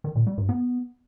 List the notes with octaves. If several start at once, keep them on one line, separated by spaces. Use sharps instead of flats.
D#3
A#2
G3
G2
B3